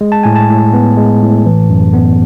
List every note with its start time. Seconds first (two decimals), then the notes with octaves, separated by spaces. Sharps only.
0.01 G#3
0.12 A5
0.23 A2 G#5
0.36 A5
0.50 A2
0.74 B3
0.97 G#3
1.22 A2
1.46 E3
1.70 F#2
1.94 B3